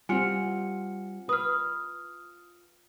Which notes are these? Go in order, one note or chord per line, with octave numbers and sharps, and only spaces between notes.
G3 C4 F4 F#5 G#5 C#7
B4 D#6 F6